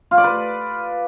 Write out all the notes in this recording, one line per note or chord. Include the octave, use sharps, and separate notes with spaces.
F4
D5
B4